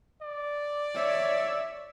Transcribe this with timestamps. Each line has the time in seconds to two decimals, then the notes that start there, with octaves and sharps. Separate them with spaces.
0.22 D5
0.94 C#5 E5